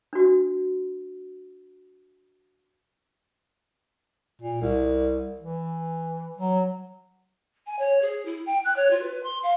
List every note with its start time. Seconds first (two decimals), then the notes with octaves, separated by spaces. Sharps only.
0.13 D4 F#4
4.41 A#2
4.61 C2
5.40 E3
6.37 F#3
7.66 G#5
7.78 C#5
8.01 G#4
8.25 E4
8.45 G5
8.64 F#6
8.76 C#5
8.90 F4
9.02 B4
9.23 C6
9.43 F5